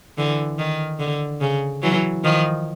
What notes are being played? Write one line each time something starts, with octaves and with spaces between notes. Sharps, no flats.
D3 E3
D#3
D3
C#3
E3 F#3
D#3 F3